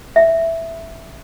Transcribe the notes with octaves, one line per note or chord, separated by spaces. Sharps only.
E5